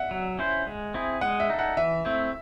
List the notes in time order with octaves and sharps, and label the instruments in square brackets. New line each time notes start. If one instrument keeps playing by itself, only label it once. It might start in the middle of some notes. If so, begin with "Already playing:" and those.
Already playing: [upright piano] E5 F#5
[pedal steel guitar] F#3
C#4 E4 C5
G#3
C4 E4 G#4
[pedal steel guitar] G#3 [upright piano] F#5
[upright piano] E5
[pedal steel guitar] D#4 A4
[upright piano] F#5
[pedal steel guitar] E3 [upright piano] E5
[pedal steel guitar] A3 C4 E4